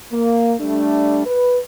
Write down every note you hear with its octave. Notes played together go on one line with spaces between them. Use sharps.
A#3
G3 A3 D4
B4